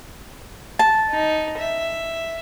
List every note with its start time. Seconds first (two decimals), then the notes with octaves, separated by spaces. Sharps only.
0.79 A5
1.10 D#4
1.58 E5